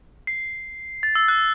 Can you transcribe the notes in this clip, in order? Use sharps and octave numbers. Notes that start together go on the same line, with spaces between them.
C7
A6
E6
F#6